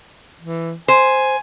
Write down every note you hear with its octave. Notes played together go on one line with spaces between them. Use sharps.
E3
C5 G#5